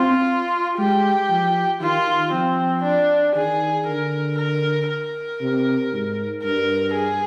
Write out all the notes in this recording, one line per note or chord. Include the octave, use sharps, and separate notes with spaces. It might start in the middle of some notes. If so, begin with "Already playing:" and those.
Already playing: C4 F4
G#3 G4
F3
D#3 F4
F3 C4
D4
D#3 G#4
D3 A#4
A#4
A#4
C3
G#2
G2 A#4
G#4